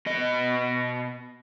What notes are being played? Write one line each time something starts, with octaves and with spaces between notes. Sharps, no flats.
B2 D#5